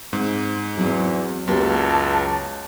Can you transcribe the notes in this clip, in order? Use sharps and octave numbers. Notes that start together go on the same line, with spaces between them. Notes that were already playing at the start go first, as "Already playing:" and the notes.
G#2 C4
E2 F#3 C4
C#2 F#2 A#3 B3 G4 A5